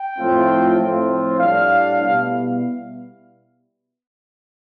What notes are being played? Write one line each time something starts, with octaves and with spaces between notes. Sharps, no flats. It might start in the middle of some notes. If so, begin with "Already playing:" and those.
Already playing: G5
A2 F3 A3 C4 F4
A2 F3 C4 F4
A2 G3 D4 F5
B2 G3 B3 E4